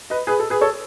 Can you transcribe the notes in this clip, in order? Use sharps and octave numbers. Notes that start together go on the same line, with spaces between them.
B4 D#5
G#4 B4
A4
G#4 B4
A4 C#5